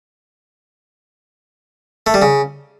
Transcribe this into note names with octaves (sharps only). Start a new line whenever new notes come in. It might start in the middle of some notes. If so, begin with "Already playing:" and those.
A3
G3
C#3